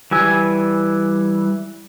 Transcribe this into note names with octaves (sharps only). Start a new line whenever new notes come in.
E3 G3 G#5 E6